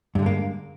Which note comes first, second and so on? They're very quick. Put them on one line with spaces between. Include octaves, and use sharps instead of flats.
G2 D3 G#3 A#3